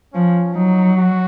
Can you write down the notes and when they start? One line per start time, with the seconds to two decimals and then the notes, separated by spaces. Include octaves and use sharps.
0.13 F3 C#4
0.55 F#3 D#4
0.97 F#4